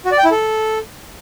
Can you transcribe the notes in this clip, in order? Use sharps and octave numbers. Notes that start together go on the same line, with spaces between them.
F#4
D5
G5
E4
A4